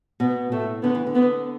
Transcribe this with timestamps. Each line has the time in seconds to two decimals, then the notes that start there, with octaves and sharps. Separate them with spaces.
0.20 B2 B3
0.52 A2 A3
0.83 D3 B3
0.95 E3
1.07 D3
1.15 B3